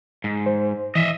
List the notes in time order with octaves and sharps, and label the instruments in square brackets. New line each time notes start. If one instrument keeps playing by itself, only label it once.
[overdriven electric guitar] G#2
[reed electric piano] C5
[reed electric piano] E3 [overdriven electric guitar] D#5 E5